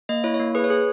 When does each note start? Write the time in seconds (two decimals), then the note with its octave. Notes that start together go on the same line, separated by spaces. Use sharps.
0.09 A#3 D#5
0.24 E4 C#5
0.34 C#5
0.40 A#3
0.55 G#4 B4
0.64 C#5
0.70 G#4